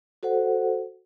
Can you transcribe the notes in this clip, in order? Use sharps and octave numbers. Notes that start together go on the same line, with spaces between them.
F#4 A4 C5 F#5